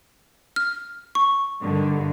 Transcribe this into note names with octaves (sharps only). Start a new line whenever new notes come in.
F6
C#6
G2 D3 D#3